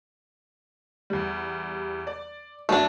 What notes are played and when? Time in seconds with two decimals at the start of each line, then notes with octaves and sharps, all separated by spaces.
1.10 E2 G3
2.07 D5
2.69 F#2 A3 B3 D4